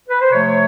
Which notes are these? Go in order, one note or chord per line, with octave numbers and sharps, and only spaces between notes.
B4
C5
C3 F3 A3 C#5